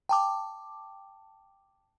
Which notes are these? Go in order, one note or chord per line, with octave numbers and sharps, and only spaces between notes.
G5 A5 D6